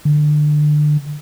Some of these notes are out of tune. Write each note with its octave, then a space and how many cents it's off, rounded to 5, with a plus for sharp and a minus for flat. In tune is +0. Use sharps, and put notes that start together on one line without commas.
D3 +25